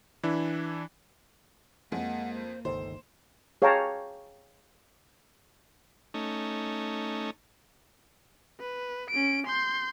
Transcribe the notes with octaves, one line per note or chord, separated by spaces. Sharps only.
E3 D4 E4
F2 G#3 A#3 F#5
C5
G1 C#2 D#3 A4 C5
G#4 C#5 F5 G5 A5 A#5
A3 C#4 D#4
B4
C#4 D7
C6 G6